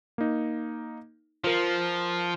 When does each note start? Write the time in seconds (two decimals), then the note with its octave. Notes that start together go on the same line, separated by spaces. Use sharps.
0.18 A#3 D#4
1.44 F3 F4 A#4